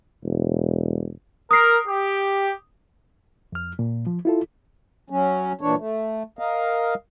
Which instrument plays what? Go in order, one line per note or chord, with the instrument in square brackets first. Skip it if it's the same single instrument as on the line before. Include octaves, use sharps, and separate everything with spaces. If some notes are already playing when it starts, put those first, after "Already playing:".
[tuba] E1
[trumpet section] A#4 [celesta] D#6 C7
[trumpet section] G4
[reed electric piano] F2 F6
A#2
F3
E4 F4 A4
[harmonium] F#3 C#4
A#2 E3 D4 C#5
A3
A#4 D#5 F5